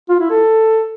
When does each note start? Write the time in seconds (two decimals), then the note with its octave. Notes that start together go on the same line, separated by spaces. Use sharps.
0.09 F4
0.20 E4
0.30 A4